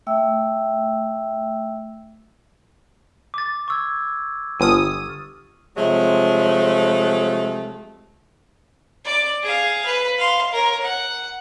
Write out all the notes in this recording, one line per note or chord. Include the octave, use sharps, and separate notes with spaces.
A3 E5 G5 E6
D6 A6
C#6 E6 G#6
G1 D#6 F6 D#7
C3 F3 F#3 G#3 A3
D5 D6
G#4 F5
B4
F5 C6
A#4 C#5
F#5